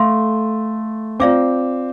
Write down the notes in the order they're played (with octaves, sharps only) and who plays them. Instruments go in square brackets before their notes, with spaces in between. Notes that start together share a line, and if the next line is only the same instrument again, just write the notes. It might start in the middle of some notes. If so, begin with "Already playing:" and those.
Already playing: [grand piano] A3 [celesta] A4 F5 C6
[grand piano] C4 [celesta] F4 D5 F5 D6